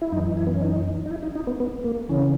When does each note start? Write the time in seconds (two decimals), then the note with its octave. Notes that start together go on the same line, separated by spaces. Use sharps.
0.02 E4
0.12 F#2 D#4
0.17 E3
0.37 E4
0.47 B3
0.54 C#4
0.61 D#4
1.06 D#4
1.11 E4
1.23 D#4
1.35 D#4
1.47 B3
1.60 B3
1.84 A#3
2.09 C#3 E3 C#4